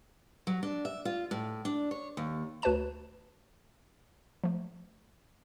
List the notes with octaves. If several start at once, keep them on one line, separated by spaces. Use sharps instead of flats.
F#3
D4
E5
F4
A2
D4
C#5
D#2
D2 F#4 B4 C#5 A5 E7
F3 A3